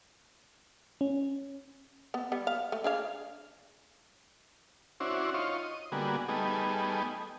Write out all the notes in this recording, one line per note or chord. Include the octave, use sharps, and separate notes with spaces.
C#4
B3
G3 B3
F5
A3
D4 G#4 F5
C#4 D4 E4 F#4 C5
D#4 F4 C#5 C6
D#5
D3 G3 A#3 B3 F#4 G#4
G3 A3 B3 D#4 G#4